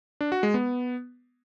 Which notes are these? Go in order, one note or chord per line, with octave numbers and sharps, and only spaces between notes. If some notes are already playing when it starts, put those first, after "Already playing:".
D4
F#4
G#3
B3